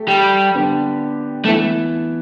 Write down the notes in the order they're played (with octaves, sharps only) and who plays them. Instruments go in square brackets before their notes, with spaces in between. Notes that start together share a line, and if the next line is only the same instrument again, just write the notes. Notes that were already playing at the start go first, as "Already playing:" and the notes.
Already playing: [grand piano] A3 G4
[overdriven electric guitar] G3
[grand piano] D3 B3 G4
[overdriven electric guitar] A3 [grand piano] E4
[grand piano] E3 B3